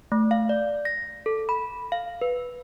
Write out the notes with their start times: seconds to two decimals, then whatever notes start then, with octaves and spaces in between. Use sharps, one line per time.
0.12 A3
0.31 F5
0.49 D5
0.85 A#6
1.26 A4
1.49 B5
1.92 F5
2.21 B4